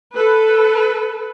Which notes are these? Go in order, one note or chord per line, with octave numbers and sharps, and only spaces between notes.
A4 B4